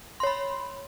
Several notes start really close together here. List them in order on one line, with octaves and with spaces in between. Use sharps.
C6 C#5 B5